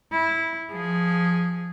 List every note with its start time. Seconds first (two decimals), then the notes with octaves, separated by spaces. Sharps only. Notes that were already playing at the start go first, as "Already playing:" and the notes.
0.12 E4
0.71 F3 G#4